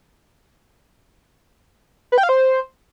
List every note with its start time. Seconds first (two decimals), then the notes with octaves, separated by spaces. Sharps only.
2.12 B4
2.18 G5
2.23 F5
2.29 C5